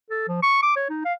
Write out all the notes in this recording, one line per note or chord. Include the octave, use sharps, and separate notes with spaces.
A4
F3
C#6
D6
C#5
D#4
F5